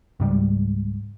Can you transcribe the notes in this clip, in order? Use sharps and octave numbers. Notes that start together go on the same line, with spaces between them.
C#2 G#2 G3